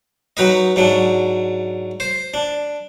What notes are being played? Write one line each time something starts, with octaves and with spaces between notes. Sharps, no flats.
F#3 D#4 B4 D#5
G#2 F#3 D4
C5
D4